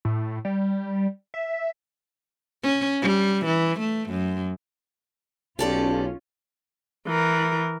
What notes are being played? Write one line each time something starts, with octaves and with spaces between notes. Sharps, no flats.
A2
G3
E5
C#4
G3
E3
A3
F#2
B1 C#4 F4 G4 A4 D5
E3 A#4